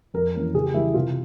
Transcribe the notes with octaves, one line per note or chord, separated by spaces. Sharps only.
F2 A#4
E3 A#3 C#4
C#3 G#4
G4
E3 G3 E4
C3 F4